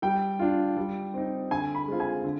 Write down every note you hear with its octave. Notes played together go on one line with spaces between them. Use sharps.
G3 G5
D4 F4
G3
C4 D#4
D3 G#5
B5
G#3 C4 F4
G#5
D3